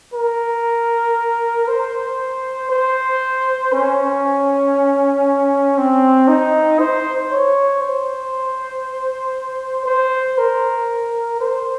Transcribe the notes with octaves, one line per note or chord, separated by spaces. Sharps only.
A#4
C5
C5
C#4
C4
D#4
C5
C#5
C5
C5
A#4
C5